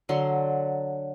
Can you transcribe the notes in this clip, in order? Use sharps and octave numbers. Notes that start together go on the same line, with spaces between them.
D3 F#3 C6